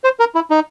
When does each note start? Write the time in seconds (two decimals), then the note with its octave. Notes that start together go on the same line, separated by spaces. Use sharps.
0.04 C5
0.20 A#4
0.35 E4
0.50 D#4